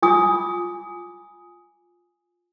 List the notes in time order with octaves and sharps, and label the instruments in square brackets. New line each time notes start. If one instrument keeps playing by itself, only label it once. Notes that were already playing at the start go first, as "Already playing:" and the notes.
[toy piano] F4 G#5 D6 D#6